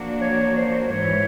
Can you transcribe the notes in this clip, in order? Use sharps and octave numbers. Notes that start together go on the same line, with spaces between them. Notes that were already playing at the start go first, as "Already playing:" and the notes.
Already playing: F3 A#3 D4 F#4
C#5
C5
G#2 E3 G#3 C#5